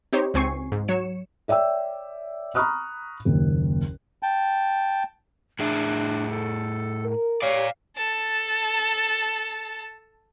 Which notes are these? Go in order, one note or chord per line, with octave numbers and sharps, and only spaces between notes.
C4 D#4 G4 C5 C#5
C#2 C4 G#5 C#6 C7
G#2
F#3 C#5 C#7 E7
C#5 D5 E5 G5 E6
A#5 B5 C#6 D#6 F6 F#6
F#1 D#2
G5 A5
A2 D4 G#4 E5
A4
A#4
G4 C#5 D5 F5
A4 A5